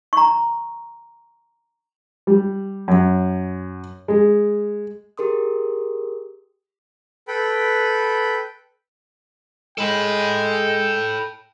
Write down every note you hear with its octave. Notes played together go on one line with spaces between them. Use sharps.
A#5 C#6
G3
F#2
G#3
G4 G#4 A#4 C6 D#6
A4 B4 G5 B5
G#3 A4 G5 B5